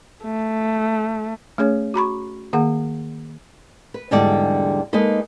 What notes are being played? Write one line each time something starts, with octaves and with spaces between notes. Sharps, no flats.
A3
A3 C#4 G#4 C#5
F#4 A#5 B5 C#6
D#3 A#3 G#4 F#5
B4
E2 G#2 D3 G3 A3 D5
G#3 A#3 D#4 A4 B4 D#5